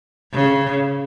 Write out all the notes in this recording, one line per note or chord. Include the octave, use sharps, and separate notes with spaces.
C#3